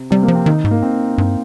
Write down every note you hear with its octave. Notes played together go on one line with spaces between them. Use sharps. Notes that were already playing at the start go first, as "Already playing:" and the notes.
Already playing: C3
C3 G3
A#3
F3
C4
D#3 D#4
G#2
A#3
C4
G2